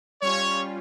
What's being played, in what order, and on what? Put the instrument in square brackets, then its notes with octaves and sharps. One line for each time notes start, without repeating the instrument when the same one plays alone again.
[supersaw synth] G3 C#4 F4 [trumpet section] C#5